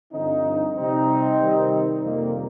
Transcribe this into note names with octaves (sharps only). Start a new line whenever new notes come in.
G2 D3 F3 C4 D#4
C3 G3 C4 D#4
C3 D#3 G3
F2 C3 D#3 G3 A#3